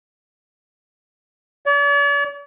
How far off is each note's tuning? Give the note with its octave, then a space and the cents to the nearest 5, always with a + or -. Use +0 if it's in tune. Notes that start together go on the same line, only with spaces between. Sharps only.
D5 -45